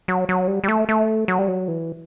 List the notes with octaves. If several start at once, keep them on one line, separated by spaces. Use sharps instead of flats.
F#3
F#3
G3
G3
A3
A3
F#3
G3
F#3
E3